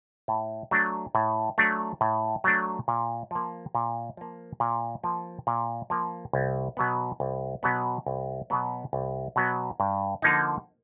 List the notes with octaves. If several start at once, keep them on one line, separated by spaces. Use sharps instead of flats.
A2
F#3 A3 D4
A2
F#3 A3 D4
A2
F#3 A3 D4
A#2
F3 A#3
A#2
F3 A#3
A#2
F3 A#3
A#2
F3 A#3
C2
B2 F#3 B3
C2
B2 F#3 B3
C2
B2 F#3 B3
C2
B2 F#3 B3
G2
D3 F3 A#3 D#4